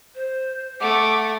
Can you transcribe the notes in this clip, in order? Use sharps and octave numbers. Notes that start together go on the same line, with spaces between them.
C5
A3 F#5 D6